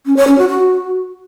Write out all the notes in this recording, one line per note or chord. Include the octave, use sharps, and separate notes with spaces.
C#4
C#5
C#4
F#4
F#4